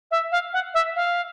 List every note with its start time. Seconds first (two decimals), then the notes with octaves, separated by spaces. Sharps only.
0.11 E5
0.32 F5
0.53 F#5
0.74 E5
0.96 F5